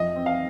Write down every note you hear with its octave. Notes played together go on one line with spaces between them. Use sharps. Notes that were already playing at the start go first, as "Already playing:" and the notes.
Already playing: F2 D#5
C4
F5